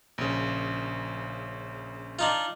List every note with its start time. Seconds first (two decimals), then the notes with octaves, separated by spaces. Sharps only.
0.18 A#1 C#3
2.19 D4 D#4 F4